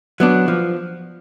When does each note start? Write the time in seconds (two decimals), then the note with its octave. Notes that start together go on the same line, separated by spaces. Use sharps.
0.20 F#3 B3 D4
0.48 F3